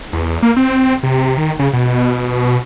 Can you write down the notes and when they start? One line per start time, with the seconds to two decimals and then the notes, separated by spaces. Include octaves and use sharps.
0.13 E2
0.43 A#3
0.57 C4
1.03 C3
1.38 D#3
1.59 C#3
1.73 B2